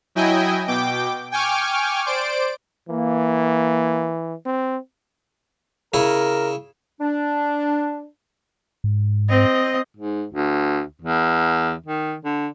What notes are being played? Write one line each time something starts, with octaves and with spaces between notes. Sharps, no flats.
F#3 E4 D#5 G5 G#5
B2 G5 D6
G5 G#5 C#6 D6 F6
C5 D5 D7
E3 A#3
C4
C#3 E4 A#4
D4
G#2
C4 D#5
G#2
D2
E2
D#3
D3